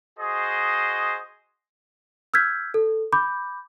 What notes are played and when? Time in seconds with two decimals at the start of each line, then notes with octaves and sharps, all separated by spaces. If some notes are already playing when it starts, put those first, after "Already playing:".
0.19 F#4 G#4 C5 D#5
2.34 E6 F6 G6 G#6 B6
2.74 A4
3.13 B5 D6 G6